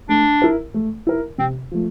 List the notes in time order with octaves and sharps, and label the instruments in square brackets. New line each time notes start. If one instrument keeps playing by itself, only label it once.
[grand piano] A3 [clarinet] D4
[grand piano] E4 A#4
A3
E4 A#4
[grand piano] C3 [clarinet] C4
[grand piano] F3 A3